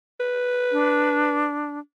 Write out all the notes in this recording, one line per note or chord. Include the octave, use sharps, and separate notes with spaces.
B4
D4